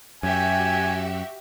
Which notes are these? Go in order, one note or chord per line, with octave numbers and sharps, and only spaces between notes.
F#2 F#4 G4 E5 G#5